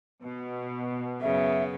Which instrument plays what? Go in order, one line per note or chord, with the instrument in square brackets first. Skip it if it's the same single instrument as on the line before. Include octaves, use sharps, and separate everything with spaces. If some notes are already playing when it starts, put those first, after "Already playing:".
[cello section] B2
[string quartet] F#2 C#3 B3 [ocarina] E5